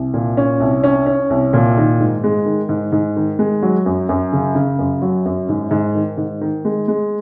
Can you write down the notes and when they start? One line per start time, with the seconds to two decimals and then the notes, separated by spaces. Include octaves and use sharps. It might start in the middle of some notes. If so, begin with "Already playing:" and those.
Already playing: C2
0.14 A#2
0.37 C#4
0.60 C2
0.84 C#4
1.06 C#4
1.30 C2
1.53 A#2
1.77 D#3
2.00 G#2
2.24 G#3
2.46 D#3
2.69 G#2
2.92 G#2
3.16 D#3
3.39 G#3
3.63 F#3
3.86 F#2
4.09 F#2
4.33 C#3
4.55 C#3
4.79 F#2
5.02 F#3
5.26 F#2
5.49 G#2
5.71 G#2
5.95 D#3
6.17 G#2
6.41 D#3
6.65 G#3
6.88 G#3